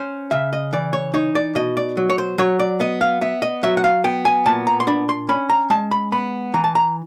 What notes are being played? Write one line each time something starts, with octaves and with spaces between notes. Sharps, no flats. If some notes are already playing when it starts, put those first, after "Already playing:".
Already playing: C#4 C5
C#3 E5
D#5
E3 D5
C#5
D#4 C#5
D5
B2 D#5
D5
F#3
C#5
C5
F#3 C#5
D5
B3 D#5
F5
B3 E5
D#5
F#3 E5
F#5
F5
B3 G5
G#5
A#2 A5
A#5
C6
D4 B5
C6
C#4 B5
A#5
G#3 A5
B5
B3 B5
E3 A#5
A5
A#5